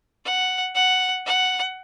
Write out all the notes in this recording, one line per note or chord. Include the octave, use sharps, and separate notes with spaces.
F#5
F#5
F#5